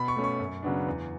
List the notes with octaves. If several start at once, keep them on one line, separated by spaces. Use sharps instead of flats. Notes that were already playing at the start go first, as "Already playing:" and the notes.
Already playing: B2 B5
C#6
A3 C#4
C#6
F#2
C#3 F#3 B3 D4
E2